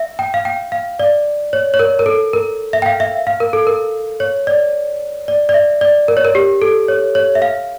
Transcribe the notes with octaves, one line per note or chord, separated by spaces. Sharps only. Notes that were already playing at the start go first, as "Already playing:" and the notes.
Already playing: E5
G5
F5
G5
F5
D5
C#5
C#5
A#4
A#4
A4
A#4
E5
G5
F5
E5
F5
A#4
A4
A#4
C#5
D5
D5
D5
E5
D5
A#4
C#5
A#4
G4
A4
C#5
C#5
E5
F5